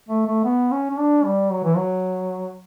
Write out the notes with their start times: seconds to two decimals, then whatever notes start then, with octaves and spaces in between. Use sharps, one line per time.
0.09 A3
0.27 A3
0.45 B3
0.72 C#4
0.91 C#4
0.99 D4
1.25 G3
1.52 F#3
1.65 E3
1.77 F#3